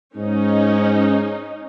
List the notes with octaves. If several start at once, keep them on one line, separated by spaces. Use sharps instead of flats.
G#2 C#4 D#4